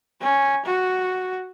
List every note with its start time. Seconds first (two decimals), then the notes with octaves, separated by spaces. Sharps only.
0.21 C#4
0.66 F#4